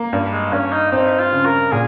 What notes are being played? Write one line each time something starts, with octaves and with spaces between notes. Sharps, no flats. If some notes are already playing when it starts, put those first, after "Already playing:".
Already playing: A#3
G2
G#3
G2 C#4
D#4
C4 D#4
F4
C#3
A#4
A#2 G#4